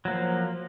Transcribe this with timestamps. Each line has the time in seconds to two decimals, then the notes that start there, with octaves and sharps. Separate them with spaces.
0.05 F#3
0.08 A#3
0.10 F3